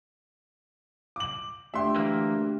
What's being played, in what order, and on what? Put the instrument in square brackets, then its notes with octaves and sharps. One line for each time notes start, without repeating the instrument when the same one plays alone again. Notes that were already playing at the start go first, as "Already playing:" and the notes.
[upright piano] D6 F#7
[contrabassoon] D2 [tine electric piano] G4 G5 [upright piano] E5 C6
[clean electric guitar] E3 A#3